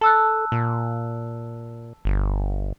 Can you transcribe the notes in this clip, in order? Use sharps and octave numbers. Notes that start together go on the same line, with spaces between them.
A4 A5 E6 F#6
A#2
G1